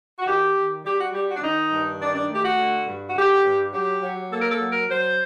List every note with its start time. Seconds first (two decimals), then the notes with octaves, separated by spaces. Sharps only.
0.19 F#4
0.26 D#3 G4
0.55 D#3
0.84 G3 G4
0.99 F#4
1.13 G3 G4
1.28 F#4
1.36 D4
1.42 D#3 D#4
1.71 G2
2.00 D#3 D4
2.14 D4
2.29 A3
2.34 G4
2.43 F#4
2.58 D3
2.87 G2
3.09 F#4
3.16 D3 G4
3.44 G2
3.73 F#3 G4
4.02 F#3
4.31 A#3 A4
4.41 A#4
4.50 A4
4.60 F#3
4.69 A#4
4.89 F#3 C5